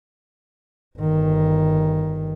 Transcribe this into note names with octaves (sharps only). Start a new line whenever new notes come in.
G1 D#3